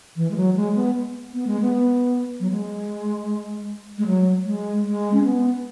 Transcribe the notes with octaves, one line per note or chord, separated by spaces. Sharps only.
E3
G#3
F#3
G#3
B3
B3
G#3
B3
F#3
G#3
G#3
F#3
G#3
G#3
C#4
B3